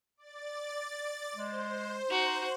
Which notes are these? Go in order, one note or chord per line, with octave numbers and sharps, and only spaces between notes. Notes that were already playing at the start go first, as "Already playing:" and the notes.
D5 A6
G#3 C5
D#4 F#4